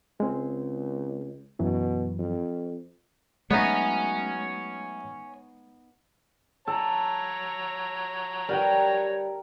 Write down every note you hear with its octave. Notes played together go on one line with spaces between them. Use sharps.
C#2 G#3 C4
F#2 B2 E3 F#3
F2
F#3 G#3 A3 B3 D#4 C#5 D#5 G#5
A4 C#5 A#5
G3 A#4 F#5 G5